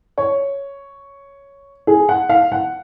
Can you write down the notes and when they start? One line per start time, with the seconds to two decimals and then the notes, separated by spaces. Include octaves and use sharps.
0.18 C#5
1.87 G#4
2.09 F#5
2.29 F5
2.52 F#5